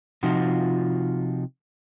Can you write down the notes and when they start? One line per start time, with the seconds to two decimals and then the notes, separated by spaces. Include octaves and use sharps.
0.23 C3 F3 D#4 F4 F#4